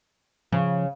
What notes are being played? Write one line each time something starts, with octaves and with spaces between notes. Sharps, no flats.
C#3 F3